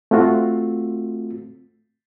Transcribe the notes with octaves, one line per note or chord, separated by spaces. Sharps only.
A3 C4 F4 F#4